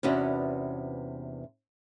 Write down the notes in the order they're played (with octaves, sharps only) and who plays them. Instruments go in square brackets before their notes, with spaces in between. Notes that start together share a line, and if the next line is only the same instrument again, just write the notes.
[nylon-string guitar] E2 C3 B3 C#4 D4 F#4